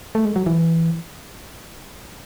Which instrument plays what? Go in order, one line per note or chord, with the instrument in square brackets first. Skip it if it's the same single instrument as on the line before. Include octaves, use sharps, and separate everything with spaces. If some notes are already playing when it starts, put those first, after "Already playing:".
[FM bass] A3
G#3
F#3
E3